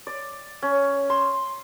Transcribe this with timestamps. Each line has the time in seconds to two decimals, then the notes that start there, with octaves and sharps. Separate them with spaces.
0.07 D5
0.62 C#4
1.10 C6